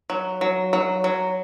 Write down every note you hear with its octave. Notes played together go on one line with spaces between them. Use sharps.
F#3
F#3
F#3
F#3